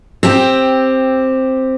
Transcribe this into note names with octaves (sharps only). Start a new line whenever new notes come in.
C4 G4